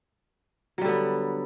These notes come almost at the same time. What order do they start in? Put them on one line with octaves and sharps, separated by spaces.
F#3 G3 D3 B3